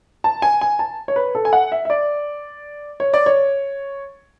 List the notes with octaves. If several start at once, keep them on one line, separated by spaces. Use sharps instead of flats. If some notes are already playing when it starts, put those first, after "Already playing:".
A5
G#5
G#5
A5
C#5
B4
A4
G#5
F#5
E5
E5
D5
C#5
D5
C#5